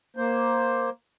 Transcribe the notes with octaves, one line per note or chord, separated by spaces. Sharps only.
A#3 C5